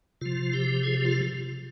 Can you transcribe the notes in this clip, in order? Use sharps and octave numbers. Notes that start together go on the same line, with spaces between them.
C3 F3 F4
G4
G#4
G4
F4